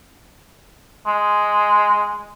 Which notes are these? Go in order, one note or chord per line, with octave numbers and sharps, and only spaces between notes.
G#3